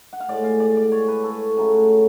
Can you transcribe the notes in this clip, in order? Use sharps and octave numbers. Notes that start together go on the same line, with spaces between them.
F#5
F5
A2 G#3 D5
F5
D5
D5
C#5
B4
A4
C#3 F#3 A3